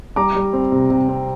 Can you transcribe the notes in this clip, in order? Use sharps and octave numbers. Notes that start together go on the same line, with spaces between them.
G3 A#5 D6
G3
C4
C3
C3
C4